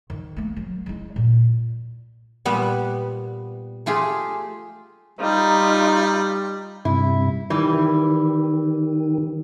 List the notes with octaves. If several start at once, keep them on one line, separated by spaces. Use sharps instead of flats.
D#3
A3 A#3
F#3
G#3 E4
A#2
A#2 G3 B3
A3 F4 G4 G#4
G3 D#4 F4
G2 C3 E4
D#3 E3 G3